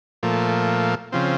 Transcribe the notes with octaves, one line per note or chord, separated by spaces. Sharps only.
A#2 F3 A3
C#3 F3 C4